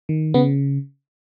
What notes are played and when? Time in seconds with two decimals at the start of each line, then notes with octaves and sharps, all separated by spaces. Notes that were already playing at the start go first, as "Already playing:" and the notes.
0.09 D#3
0.34 C#3 B3